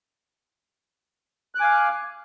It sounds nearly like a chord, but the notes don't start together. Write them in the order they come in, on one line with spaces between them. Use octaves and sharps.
F#6 D6 G#5 F5